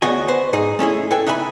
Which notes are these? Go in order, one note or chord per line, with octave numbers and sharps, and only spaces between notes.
D2 C#3 B3 F#4 D#5 G#5
B4 C5
G#2 D#4 G#4
A3 C#4 E4 G#4
A4 B4 G5 G#5
D#4 B4 E5 G#5 B5